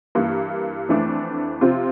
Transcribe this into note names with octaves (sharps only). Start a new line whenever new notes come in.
G2 E3 A#3
F2 E3 A3 D4
C3 F3 C4 F4